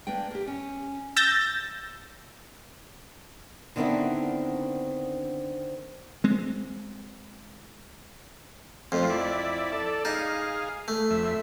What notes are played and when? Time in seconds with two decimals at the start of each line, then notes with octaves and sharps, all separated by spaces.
0.07 A#3 D4 B4 G5
0.31 G4 A#4
0.47 C#4
1.16 E6 G6 A6 A#6
3.76 D3 D#3 B3 C4 D4 E4
6.24 G#3 C4
8.92 F2 F3 A3 F4
9.10 E4 D5
9.72 A4 D5
10.05 D#4 G#4 F5
10.88 A3
11.11 F2 E5